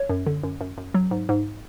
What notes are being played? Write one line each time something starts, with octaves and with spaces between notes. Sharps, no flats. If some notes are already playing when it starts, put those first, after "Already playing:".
Already playing: C#5
F#2
D3
F#2
F#2
F#2
F#3
G#2
G#2